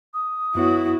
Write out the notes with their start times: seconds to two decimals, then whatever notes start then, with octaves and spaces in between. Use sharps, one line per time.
0.14 D#6
0.55 F#2 B3 E4 F#4 C#5